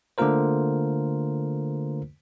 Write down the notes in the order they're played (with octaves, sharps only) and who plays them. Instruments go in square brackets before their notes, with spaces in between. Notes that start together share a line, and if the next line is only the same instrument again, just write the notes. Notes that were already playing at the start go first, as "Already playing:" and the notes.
[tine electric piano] D3 A3 A#3 F4 A#4 C5